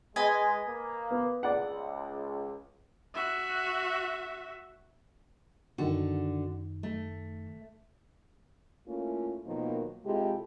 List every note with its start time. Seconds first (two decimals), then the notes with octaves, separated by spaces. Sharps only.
0.16 G#3 B4 D#5 G#5
0.68 A#3
1.11 B3
1.43 C#2 D5 F#5
3.15 F#4 E5
5.78 F#2 D3 D#3 F#4
6.83 A3
8.88 A3 A#3 C#4 E4 F4
9.46 B2 D#3 F3 F#3 A#3
10.05 C3 G#3 E4 F4 G4 A4